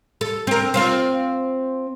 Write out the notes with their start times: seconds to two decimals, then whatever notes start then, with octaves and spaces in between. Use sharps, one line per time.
0.21 A4
0.47 C4 A#4
0.74 C4 F4 C5